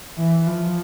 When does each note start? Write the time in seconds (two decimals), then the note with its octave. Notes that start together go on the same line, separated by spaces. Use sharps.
0.18 E3
0.47 F3